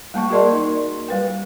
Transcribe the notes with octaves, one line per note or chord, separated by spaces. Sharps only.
G3 A#3 A5 C#6
F#4 G#4 A#4 D5 D#5 C6
D#4
G3 B4 G5